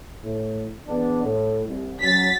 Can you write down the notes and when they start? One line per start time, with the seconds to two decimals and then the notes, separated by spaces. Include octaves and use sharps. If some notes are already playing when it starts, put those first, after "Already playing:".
0.22 A2
0.86 E2 B3 D4
1.23 A2
1.65 C2
2.00 F#3 C#4 A6 B6